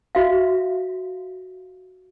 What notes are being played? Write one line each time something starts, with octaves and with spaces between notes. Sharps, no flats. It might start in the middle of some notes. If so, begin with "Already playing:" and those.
F#4 E5 F5